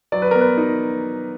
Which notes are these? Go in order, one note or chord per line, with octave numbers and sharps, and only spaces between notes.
F#3 D5
B4
B3 A#4
B4
D#4